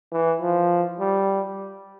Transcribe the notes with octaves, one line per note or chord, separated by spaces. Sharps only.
E3
F3
G3